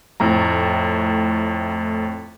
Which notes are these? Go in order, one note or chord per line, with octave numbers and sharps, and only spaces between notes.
F2 A2 A3 A#5